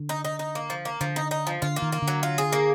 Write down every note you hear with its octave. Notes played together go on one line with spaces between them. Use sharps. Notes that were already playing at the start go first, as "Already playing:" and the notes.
Already playing: D3
D#4
D#4
D#4
A#3
F3
A#3
D3 F3
D#4
D#4
F3
D3 F4
A#3
D#3
A#3
D3
F#3
F4
G#4
A#3